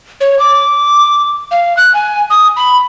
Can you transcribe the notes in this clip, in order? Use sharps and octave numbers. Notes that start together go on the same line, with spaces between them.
C#5
D6
F5
F#6
G#5
D#6
B5